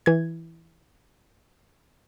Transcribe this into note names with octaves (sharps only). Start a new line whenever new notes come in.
E3 G#6